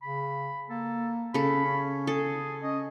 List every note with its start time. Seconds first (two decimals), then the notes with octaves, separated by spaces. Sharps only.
0.02 C#3 B5
0.70 A#3 A4
1.34 C#3 A4 B5
1.65 C#4
2.07 G#4 A4
2.63 C#4 D#5